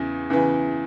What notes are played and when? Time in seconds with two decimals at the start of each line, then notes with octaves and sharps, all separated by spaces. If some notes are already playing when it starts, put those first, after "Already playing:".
Already playing: E2 C#3 E3
0.30 E2 C#3 E3